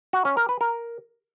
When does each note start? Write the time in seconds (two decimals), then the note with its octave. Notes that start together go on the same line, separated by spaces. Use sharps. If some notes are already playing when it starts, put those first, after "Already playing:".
0.13 F#4
0.25 C#4
0.37 A#4
0.49 B4
0.61 A#4